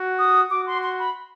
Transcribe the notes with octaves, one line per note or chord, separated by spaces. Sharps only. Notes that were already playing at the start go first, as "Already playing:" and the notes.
Already playing: F#4
D#6
F#4 D6
C6
C6
B5